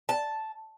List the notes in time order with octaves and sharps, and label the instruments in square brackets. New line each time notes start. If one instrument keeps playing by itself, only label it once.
[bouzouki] A5